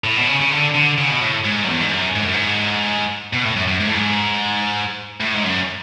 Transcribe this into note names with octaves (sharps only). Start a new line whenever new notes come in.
A2
B2
C#3
C#3
D3
D3
C#3
B2
A2
G#2
F#2
E2
G#2
F#2
G#2
F#2
G#2
B2
A2
F#2
F#2
G#2
A2
G#2
A2
G#2
F#2